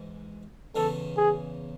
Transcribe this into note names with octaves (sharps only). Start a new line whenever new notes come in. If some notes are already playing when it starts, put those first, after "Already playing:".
Already playing: G#2 E3 G#3
E2 C#3 E3 A4
G#4